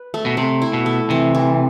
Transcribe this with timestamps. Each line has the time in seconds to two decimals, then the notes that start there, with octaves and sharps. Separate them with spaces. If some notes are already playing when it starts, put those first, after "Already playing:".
Already playing: B4
0.14 A3
0.26 B2
0.37 C3 A3
0.62 E4
0.73 B2
0.86 A3
1.10 C3 E3
1.35 E3